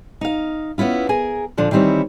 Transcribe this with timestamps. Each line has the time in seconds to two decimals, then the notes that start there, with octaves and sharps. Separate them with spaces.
0.21 D#4 F5
0.78 B3 C#4 E4 F4
1.09 G#4 A#4 G#5
1.57 A#2 D3 F3 D4
1.71 D#3 E3 G3 C4 E4 C#5